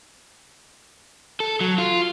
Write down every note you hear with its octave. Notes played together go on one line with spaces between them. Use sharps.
A4
F#3
F4